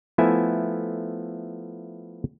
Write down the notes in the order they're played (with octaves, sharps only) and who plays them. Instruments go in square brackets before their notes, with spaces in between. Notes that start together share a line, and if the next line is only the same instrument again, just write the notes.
[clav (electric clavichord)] F3 A3 B3 E4 E5 G#5